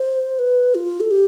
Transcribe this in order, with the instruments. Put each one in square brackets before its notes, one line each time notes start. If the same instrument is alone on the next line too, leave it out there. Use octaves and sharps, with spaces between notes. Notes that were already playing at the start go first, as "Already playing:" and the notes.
Already playing: [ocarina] C5
B4
F4
A4
G4